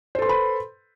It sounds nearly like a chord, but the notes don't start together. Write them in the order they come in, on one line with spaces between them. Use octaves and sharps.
C5 A4 C6 B4 B5